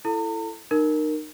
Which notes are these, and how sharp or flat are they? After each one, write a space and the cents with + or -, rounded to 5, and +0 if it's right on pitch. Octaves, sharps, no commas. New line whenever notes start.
E4 +20 A4 +0 A#5 -45
D#4 -30 A#4 +0